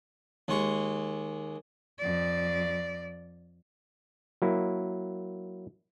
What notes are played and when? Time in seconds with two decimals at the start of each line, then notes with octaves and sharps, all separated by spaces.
0.48 D#2 G#3 C#6
1.98 F2 D5
4.42 F#3 A#3 E4